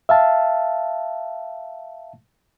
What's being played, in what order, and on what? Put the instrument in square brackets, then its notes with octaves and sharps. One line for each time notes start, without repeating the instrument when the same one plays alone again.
[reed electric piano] E5 F5 A5